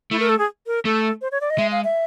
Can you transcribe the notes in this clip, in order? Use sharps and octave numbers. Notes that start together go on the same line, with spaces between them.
A3 E4
A#4
A4
G#4
A#4
A3 A4
C5
C#5
D5
D#5
G#3 E5
F5
E5